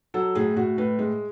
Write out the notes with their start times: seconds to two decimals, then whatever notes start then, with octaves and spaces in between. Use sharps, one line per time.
0.14 F#3 A4
0.35 A2 G#4
0.56 A2 F#4
0.78 A2 B4
0.99 G#3